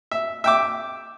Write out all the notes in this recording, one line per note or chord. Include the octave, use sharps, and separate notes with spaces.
E5
E5 G5 D6